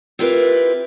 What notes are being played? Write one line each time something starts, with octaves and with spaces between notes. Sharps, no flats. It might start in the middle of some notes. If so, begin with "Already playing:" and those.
C4 E4 F4 G4 A#4 B4